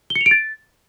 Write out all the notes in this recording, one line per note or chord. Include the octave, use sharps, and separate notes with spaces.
G7
C#7
F7
D7
A6